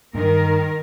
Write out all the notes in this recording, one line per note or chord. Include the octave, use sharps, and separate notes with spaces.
G2 D#3 A#4